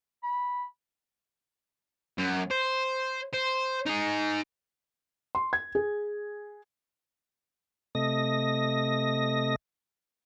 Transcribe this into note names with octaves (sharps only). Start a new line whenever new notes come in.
B5
F#2
C5
C5
D#4 G#4
C6
G#6
G#4
C3 A3 D#5 A#6